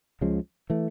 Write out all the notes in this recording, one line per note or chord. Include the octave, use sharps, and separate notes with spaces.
C#2 C#3 F3 G#3
E3 A3